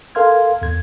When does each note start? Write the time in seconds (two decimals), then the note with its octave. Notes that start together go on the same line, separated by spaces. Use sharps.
0.15 A4 A#4 F5 C6 F6 G#6
0.62 E2 G#6